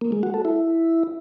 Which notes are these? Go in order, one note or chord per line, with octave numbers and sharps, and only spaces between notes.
A#3
G#3
F#4
A4
E4